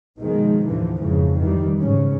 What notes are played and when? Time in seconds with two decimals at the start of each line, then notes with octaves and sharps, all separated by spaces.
0.19 B2 D#3 F3 G#3
0.66 D#2 A2 D3 E3 F3
0.98 F2 G#2 C#3 E3
1.38 D#3 E3 G3
1.77 G#2 C#3 C#4